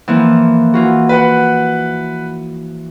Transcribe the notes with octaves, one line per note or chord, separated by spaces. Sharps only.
E3 F3 A#3
E3 F4 F#4
B4 F#5